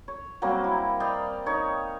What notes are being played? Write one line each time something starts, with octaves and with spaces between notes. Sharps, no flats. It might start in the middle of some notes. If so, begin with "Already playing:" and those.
C#5
F#3 G3 A#3 C4
E4
D5 D#5 F5 G5
D#4 C#5